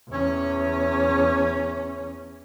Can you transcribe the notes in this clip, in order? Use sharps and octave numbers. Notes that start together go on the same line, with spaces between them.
E2 C#4